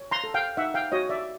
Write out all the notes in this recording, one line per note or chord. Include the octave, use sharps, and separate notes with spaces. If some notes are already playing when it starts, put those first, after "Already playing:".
Already playing: C#5
A#5 C6
A4
F5 G5
D#4 E5 F#5
F5 G5
F#4 C#5 D#5
D5 E5